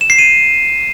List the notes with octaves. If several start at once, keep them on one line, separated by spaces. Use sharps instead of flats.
E7
C7
D#7